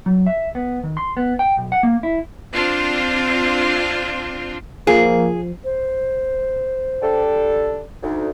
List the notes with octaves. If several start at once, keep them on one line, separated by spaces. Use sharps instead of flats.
F#3
E5
B3
D#3
C6
B3
G5
B1
F#5
A#3
E4
C4 D4 F4
F3 A#3 G#4
C5
G3 D4 A4
D2 D#4